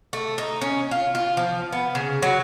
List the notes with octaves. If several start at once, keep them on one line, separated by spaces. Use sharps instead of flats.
A3
D#4
C#4
F4
F4
F3
B3
C#3
F#3